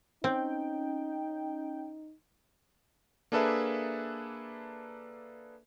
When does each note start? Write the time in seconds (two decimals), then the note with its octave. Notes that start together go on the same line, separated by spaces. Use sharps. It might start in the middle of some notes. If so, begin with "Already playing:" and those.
0.24 C4 C#4 D#4 G5
3.32 A#3 D4 G#4 A4 B4 E5